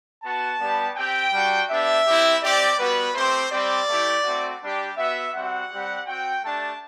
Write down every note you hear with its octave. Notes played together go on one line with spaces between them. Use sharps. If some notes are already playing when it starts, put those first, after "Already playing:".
B3 F#4 A5
G3 B3 D4 G4
C4 G4 G5
G3 D4 F#4
B3 D4 G4 E5
C4 E4 G4
C4 G4 D5
G3 B3 F#4 B4
A3 C4 G4 C5
G3 C4 G4 D5
A3 E4 G4
A3 C4 F#4
G3 D4 G4
B3 F#4 E5
G3 C4 F#4 F#5
G3 C4 G4
C4 F#4 G5
A3 D4 G4 A5